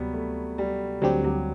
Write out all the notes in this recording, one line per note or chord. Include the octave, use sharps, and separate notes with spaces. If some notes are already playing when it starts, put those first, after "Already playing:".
Already playing: D2 C3 F#3 G3 B3
A3
G3
D2 D3 F#3 G3 C4 G4
F#3